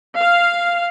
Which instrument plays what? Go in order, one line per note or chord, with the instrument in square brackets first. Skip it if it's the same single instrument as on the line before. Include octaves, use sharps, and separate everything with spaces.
[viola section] F5